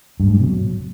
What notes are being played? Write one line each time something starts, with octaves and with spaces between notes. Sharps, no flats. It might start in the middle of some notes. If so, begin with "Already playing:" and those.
G2
G#2
G2
B2
F#3